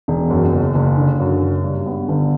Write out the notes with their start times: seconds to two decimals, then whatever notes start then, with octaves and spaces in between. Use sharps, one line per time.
0.08 E1
0.30 F#2
0.53 F#1
0.75 F#1
0.97 D3
1.20 F#2
1.42 F#1
1.64 G2
1.86 B3
2.09 G1